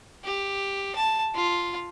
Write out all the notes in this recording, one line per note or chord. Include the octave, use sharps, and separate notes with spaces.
G4
A5
F4